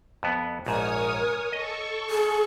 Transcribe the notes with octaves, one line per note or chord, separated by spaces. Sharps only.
F2 B3
A#1 G#2 A#4 C#5 G#5 D#6
A4 D#5 C#6
G#4